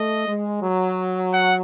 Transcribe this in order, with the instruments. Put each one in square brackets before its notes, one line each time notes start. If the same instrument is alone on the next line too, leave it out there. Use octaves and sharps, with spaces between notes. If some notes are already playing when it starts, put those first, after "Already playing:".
Already playing: [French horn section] A3 [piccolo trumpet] D#5
[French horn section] G#3
F#3
[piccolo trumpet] F#5